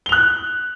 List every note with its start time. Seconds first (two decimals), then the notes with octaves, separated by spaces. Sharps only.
0.06 G7
0.09 F7
0.12 F#6